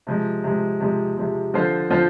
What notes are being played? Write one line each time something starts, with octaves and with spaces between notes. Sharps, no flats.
C3 F3 G#3
C3 F3 G#3
C3 F3 G#3
C3 F3 G#3
D3 F3 C4 F4 C5
D3 F3 C4 F4 C5